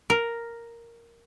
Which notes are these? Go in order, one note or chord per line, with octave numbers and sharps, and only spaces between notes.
A#4